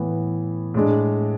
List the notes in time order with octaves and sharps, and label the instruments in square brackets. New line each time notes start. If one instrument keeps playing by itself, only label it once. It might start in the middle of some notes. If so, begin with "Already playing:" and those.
Already playing: [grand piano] A2 E3 B3
A2 G#3 D4